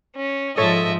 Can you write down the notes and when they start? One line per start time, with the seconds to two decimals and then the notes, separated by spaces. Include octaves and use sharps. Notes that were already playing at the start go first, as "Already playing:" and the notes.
0.15 C#4
0.57 G#2 F3 A4 C#5 D#5 E5 A6